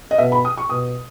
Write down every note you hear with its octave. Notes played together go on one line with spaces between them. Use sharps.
D#5
B2 E5
B5
D#6
C#6
B2 D#6